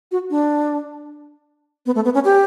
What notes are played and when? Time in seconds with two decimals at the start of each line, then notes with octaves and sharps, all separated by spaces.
0.12 F#4
0.30 D4
1.86 B3
1.95 A3
2.05 B3
2.14 C#4
2.24 G4